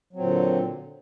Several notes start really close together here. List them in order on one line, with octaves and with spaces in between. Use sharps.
F#3 C4 A#2 D3